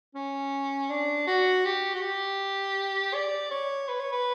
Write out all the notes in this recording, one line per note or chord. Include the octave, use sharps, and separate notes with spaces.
C#4
D4
F#4
G4
F#4
G4
D5
C#5
B4
C#5
B4